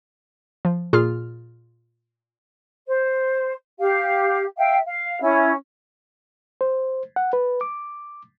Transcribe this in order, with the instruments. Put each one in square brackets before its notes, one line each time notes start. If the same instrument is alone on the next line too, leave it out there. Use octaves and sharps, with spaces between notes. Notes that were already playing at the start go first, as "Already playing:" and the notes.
[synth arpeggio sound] F3
A#2 F4 G#4 F6
[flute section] C5
G4 F5
E5 F5 G5
F5
C#4 E4
[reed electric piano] C5
F#5
B4
D6